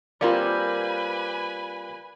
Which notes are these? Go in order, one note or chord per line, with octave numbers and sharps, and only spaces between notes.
G3 A#3 C4 F4 B4 D5 G#5 B5